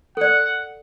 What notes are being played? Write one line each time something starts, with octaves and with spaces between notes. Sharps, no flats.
A4 D5 F#5